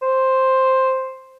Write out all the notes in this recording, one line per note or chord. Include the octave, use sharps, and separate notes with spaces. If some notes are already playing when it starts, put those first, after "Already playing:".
C5